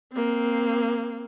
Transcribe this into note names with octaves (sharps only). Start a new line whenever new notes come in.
A#3 C4